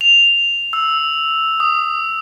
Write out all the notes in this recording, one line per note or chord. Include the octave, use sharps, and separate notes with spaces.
F7
E6
D#6